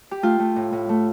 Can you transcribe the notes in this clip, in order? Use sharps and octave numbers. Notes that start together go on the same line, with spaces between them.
G4
A3 F4
A3
A2
A2
A3